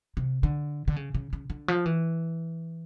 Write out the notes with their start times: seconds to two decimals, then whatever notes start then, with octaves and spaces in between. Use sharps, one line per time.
0.17 C3
0.43 D3
0.88 D3
0.96 C#3
1.15 C#3
1.33 C#3
1.50 D3
1.68 F3
1.86 E3